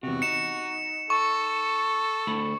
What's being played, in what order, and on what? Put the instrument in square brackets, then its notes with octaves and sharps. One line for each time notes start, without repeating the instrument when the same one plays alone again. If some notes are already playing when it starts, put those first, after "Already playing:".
[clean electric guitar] E2 C3 [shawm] F#4
[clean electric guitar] D#4 [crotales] C#7 E7
[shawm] A4 [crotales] C#6
[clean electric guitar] D2 A3 B5